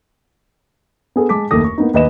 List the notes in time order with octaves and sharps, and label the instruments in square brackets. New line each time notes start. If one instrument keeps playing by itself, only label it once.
[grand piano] B3 G#4 A4
G#3 A5 D6 B6
F#1 D#2 A3 D6 D#6 A#6
C#6
A#3 B3 D#4
D#2 B4 D#5 E7